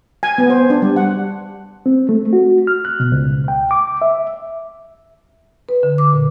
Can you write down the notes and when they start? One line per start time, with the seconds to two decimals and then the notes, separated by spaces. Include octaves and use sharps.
0.23 G#5
0.38 B3
0.50 C5
0.70 D4
0.82 G3
0.96 F#5
1.86 C4
2.09 A3
2.33 F#4
2.67 F6
2.85 F#6
3.00 B2
3.12 C#2
3.48 G5
3.71 D6
4.02 E5
5.69 B4
5.83 D3
5.98 D6
6.13 A#2